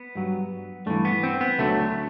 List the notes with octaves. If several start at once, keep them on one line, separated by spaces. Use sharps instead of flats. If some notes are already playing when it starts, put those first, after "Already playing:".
Already playing: B3
G2 F#3
G2 E3 A3
B3
C4
B3
D2 D3 F#3 A3